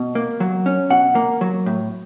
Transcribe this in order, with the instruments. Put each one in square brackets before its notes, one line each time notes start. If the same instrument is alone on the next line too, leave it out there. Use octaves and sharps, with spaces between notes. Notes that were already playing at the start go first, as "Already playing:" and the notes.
Already playing: [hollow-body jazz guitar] B2
A#3
F#3
C#4
B2 F#5
A#3
F#3
A2